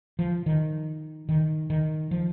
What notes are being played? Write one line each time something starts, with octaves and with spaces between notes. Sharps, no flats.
F3
D#3
D#3
D#3
F3